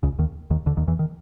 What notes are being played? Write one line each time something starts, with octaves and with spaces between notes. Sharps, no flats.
C#2 C#3
D#2 D#3
D#2 D#3
D2 D3
D#2 D#3
E2 E3
D#3